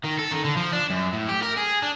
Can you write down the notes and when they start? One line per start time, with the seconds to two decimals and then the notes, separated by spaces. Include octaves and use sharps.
0.04 D#3
0.19 A4
0.31 D#3
0.45 D3
0.57 F3
0.73 D4
0.90 F#2
1.13 A2
1.29 G4
1.43 A#4
1.57 G#4
1.83 D4